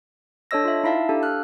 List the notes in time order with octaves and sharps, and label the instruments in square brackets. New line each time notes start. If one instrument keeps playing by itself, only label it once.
[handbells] D4 A4 C#5 D#5 E6 A#6
F4 E5
D#4 E4 E5 F5 A5
D4 G4 A4 F5
F6 F#6